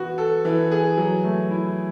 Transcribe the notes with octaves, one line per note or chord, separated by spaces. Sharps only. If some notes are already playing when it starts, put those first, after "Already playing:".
Already playing: E3 B3 F#4
A4
E3
G#4
F#3
A3
E4